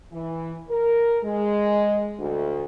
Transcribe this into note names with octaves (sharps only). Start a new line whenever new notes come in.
E3
A#4
G#3
D2